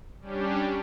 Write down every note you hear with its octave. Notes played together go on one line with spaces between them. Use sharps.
G3 C#4 D4 G4